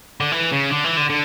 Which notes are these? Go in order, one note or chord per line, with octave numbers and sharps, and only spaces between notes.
D3
E3
C#3
D3
E3
D3
D3